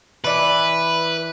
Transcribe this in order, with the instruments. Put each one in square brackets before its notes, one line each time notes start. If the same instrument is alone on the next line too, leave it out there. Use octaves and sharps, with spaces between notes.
[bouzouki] E3 D5 [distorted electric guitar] B4